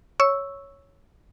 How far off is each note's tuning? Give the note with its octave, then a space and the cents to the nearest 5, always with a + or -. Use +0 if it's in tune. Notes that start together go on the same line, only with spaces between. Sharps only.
C#5 +0 C#6 +0 E6 -5